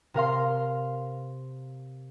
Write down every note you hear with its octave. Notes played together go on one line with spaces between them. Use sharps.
C3 A#4 F5 C6